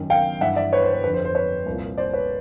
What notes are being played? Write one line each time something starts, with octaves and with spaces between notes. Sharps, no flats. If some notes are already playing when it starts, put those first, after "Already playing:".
Already playing: F#2 D#3
F5 G5
G2 E3 E5 F#5
D5 E5
B4 C#5
C5
B4
F2 D3 B4
C5
C5
B4 C#5
C2
A#2
C5 D5
B4 C#5